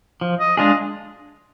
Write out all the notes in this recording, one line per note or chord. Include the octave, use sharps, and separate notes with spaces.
F3
D#5
G#3 D4 F4 G#4 D#5